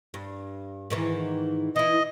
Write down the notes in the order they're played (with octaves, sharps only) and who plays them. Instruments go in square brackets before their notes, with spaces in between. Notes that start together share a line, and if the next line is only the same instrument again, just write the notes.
[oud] G2
G#2 D#3 E3
[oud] E3 E4 [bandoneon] D#5